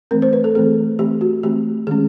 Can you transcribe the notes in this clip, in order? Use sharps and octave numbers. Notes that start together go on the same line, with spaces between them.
E3 A3 C4 A#4
C5
B4
A4
E3 A3 C4 G#4
E3 A3 C4 G4
F#4
E3 A3 C4 G4
D#3 G#3 C#4 G#4